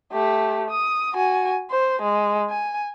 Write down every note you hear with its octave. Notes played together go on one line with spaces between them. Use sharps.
A3 G4
D#6
F#4 G#5
C5
G#3
G#5